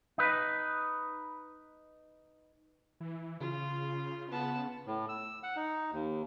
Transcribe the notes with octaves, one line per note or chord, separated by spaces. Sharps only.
D#4 B4
E3
C#3 F4
B3 A5
A2
E6
F#5
D#4
D#2